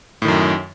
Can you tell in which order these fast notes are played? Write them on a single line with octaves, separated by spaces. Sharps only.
A2 D#3 F#2